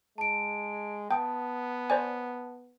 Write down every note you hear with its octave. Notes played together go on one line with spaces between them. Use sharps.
G#3 A5 D7
B3 G5 A5 D#6
C5 D5 G#5